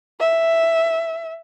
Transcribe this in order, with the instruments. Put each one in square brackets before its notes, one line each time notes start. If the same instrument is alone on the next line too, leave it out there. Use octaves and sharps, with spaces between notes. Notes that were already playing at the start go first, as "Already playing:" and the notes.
[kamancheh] E5